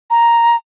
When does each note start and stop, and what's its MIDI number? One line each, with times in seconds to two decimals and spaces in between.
0.10 0.56 82